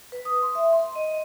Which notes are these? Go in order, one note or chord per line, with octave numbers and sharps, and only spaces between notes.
B4
D#6
C6
E5
C6
D#5